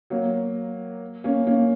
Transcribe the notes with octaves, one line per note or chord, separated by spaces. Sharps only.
F#3 A#3
A#3 C#4
A#3 C#4